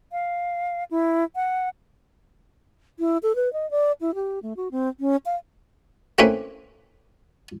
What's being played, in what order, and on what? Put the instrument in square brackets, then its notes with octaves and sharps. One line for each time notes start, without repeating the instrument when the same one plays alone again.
[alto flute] F5
E4
F#5
E4
A4
B4
D#5
D5
E4
G4
A3
F#4
C4
C#4
F5
[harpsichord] A3 A#3 C4 C#4 E4 B4